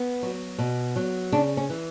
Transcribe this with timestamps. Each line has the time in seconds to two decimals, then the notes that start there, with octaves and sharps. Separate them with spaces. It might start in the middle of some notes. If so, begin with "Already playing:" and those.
Already playing: B3
0.23 F#3
0.58 B2
0.96 F#3
1.32 C#3 D4
1.57 C#4
1.70 E3